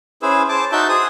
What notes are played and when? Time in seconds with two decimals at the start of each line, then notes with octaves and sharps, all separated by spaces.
0.22 C#4 E4 G#4 B4 C5 E6
0.49 C5 A5 D6
0.72 D#4 F#4 E5 A5 G6
0.89 G#4 C5 D#6